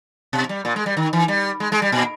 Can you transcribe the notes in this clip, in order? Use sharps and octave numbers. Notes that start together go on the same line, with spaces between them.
B2
G3
A#2
G#3
G3
D#3
E3
G3
G#3
G#3
G3
A#2